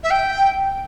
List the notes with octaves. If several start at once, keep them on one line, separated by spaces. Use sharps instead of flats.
E5
G5